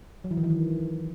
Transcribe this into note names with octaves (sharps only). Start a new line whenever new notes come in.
F#3
E3
D#3
E3
D#3